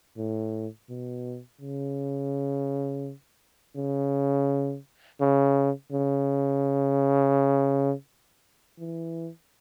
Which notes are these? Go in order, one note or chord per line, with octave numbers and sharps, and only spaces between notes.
A2
B2
C#3
C#3
C#3
C#3
E3